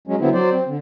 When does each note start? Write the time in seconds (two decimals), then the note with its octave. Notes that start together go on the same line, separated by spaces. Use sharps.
0.07 F#3 G#3 C#4
0.20 D3 F#3 B3 C4 E4
0.34 F#3 C5 D5
0.51 C4
0.67 D3